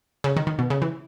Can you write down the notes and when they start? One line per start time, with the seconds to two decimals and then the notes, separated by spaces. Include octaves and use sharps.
0.24 C#3
0.36 D#3
0.47 D#3
0.59 B2
0.70 C#3
0.82 E3